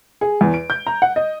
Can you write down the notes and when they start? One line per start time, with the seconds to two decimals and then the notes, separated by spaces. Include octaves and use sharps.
0.21 G#4
0.41 E2
0.54 D7
0.70 G6
0.87 A#5
1.02 F#5
1.16 D#5